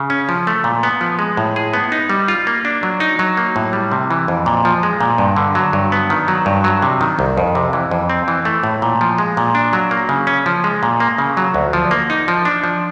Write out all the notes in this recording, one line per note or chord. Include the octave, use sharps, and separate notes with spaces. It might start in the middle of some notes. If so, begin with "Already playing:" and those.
Already playing: C#3
C#4
F3
A3
A#2
B3
F3
G#3
A2
G#4
B3
D#4
G3
F4
A#3
D4
F#3
D#4
F#3
A#3
A2
G3
C3
E3
F2
A#2
F3
G#3
A#2
G2
D3
F#3
G2
B3
D#3
F#3
G2
F#3
C3
D#3
C2
F2
C3
E3
F2
C4
E3
A3
A2
A#2
F3
G#3
A#2
D4
F#3
A#3
C#3
C#4
F3
G#3
A#2
A#3
C#3
F#3
D2
F3
A#3
D#4
F3
D4
F3